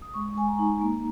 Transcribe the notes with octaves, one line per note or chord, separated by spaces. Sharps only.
D#6
G#3 C#6
G#3 G#5
A#5
D#4
A#3